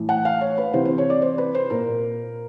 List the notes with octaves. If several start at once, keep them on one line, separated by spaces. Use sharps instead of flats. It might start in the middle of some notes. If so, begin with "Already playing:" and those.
Already playing: A2 E3
F#5
F5
C#5
B4
C3 E3 C5
C5
C#5
D5
C5
B4
C5
A#2 A#4